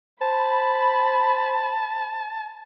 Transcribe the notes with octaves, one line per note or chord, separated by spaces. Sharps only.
C5 A5 B5